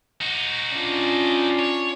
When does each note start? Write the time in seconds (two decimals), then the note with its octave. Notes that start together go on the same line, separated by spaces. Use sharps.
0.21 D#4 F#4
0.73 C#4 D4 F4
1.59 C#5